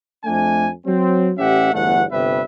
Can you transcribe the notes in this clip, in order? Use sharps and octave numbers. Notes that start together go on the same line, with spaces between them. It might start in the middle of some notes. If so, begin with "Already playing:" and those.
F2 A3 D4 G#5
F#3 C4
A1 C#4 G4 E5 F#5
G1 E2 A3 F#5
G1 C3 G3 B4 E5